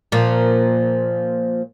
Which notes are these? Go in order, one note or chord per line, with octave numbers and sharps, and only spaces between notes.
A#2 F3